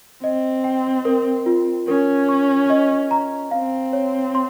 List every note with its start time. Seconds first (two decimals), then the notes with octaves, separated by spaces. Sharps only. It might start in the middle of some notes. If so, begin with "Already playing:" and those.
0.23 C4 D#5
0.64 G5
1.05 A#4
1.46 F4
1.88 C#4 A#4
2.29 C#6
2.70 D#5
3.11 A#5
3.51 C4 F5
3.93 C#5
4.35 C6